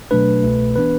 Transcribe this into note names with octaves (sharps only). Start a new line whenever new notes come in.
B2 F#3 A3 D4 B4
C2 B2 A3
E3 B3 D4 B4